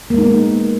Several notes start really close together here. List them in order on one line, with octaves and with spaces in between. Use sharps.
A#3 G#3 D#4 B3